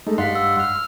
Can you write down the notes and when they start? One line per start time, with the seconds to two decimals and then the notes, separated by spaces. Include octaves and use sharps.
0.07 G#3 A3 D#4
0.18 G2 D#5 F5 F#5 C6 B6
0.35 E6
0.59 F6